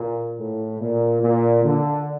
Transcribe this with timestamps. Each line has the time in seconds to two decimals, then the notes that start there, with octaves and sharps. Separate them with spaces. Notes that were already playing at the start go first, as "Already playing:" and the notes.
Already playing: A#2
0.37 A2
0.80 A#2
1.22 A#2
1.64 D3